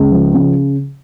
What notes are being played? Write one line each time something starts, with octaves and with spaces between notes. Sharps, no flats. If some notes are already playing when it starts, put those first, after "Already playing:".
Already playing: C#2
F3
C#3